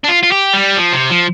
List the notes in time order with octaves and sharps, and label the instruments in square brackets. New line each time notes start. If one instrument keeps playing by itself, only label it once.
[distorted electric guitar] D4
F4
F4
G4
G3
F3
C3
F3